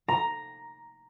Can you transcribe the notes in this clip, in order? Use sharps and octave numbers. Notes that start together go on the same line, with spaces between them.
A#5